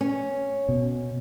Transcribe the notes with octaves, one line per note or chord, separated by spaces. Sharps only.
C#4
B2